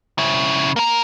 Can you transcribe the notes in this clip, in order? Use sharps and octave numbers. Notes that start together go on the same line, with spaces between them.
C#3 E4
A#3 A#4